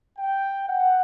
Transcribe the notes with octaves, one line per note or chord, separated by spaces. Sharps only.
G5
F#5